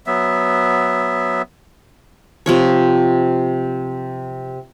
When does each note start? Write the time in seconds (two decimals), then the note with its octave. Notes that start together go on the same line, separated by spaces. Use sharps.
0.07 F#3 B3 E5
2.46 C3 F3 C#5